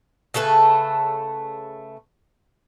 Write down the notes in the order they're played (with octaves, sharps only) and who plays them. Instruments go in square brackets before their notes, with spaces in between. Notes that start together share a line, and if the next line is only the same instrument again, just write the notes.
[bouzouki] C#3 A3 A4 B4